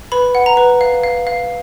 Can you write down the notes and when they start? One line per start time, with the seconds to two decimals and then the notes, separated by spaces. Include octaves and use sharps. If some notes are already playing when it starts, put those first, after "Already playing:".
0.12 B4 B5
0.35 F#5
0.46 A#5
0.57 B4
0.81 F5
1.03 F5
1.27 F5